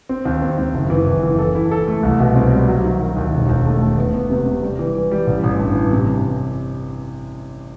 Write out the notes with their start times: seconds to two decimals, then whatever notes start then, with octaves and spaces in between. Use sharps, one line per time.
0.09 C4
0.25 D#2
0.42 C4
0.58 D#2
0.74 F#1
0.90 E3
1.07 F#1
1.23 E3
1.39 A4
1.55 E4
1.71 A4
1.88 A3
2.03 C2
2.19 B2
2.36 C4
2.52 G3
2.68 F#3
2.84 D#3
3.01 D#3
3.17 D#2
3.33 E1
3.49 D#2
3.65 A3
3.81 A3
3.98 B3
4.14 B3
4.30 C3
4.46 C3
4.62 G3
4.79 E3
4.95 E3
5.11 G3
5.27 A1
5.44 A1
5.59 G2
5.75 E3
5.91 C3